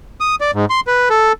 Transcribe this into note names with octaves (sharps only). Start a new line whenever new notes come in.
D#6
D5
G#2
C6
B4
A4